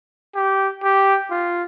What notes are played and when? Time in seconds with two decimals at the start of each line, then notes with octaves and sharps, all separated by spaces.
0.35 G4
0.83 G4
1.31 F4